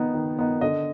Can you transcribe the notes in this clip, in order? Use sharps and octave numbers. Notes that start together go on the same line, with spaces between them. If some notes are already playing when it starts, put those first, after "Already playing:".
Already playing: D#3 B3 D#4
D#3
B3 D#4
D3 D#5